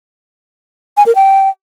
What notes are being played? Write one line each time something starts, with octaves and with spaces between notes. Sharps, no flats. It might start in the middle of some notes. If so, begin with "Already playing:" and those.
G#5
A#4
G5